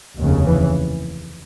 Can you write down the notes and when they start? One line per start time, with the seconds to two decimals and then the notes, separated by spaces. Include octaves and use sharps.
0.17 F1 D#2 C#3
0.45 E3